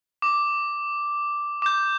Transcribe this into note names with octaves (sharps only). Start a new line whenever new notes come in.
D6
D6 G6